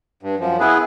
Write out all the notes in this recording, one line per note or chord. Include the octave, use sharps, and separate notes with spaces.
G2
F#2 F3
B3 E4 G#4 B4